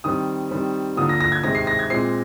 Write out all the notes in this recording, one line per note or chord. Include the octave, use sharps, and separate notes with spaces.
D#3 G3 C4 D#6
D#3 G3 C4
D3 F3 A#3 D#6
A#6
A#6
G#6
C3 D#3 G#3 C4 A#6
C7
A#6
G#6
A#2 G#3 C4 C7